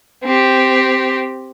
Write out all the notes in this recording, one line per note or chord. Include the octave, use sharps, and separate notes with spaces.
C4 G4